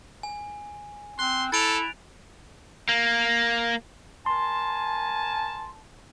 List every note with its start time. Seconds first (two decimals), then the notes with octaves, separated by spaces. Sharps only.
0.23 G#5
1.19 C4 C6 F#6
1.52 E4 A4 A6 D7 F7
2.89 A#3
4.26 A#4 G#5 A5 C6